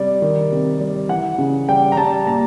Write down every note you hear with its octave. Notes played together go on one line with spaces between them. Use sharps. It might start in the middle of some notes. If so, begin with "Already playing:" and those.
Already playing: C3 G3 D5
D#3
C3
G3
E3 F#5
C#3
G3 G5
A#5
G3 A5
A#2 A#5